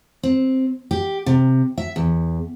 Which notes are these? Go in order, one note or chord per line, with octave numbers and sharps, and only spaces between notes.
C4
G4
C3
E5
E2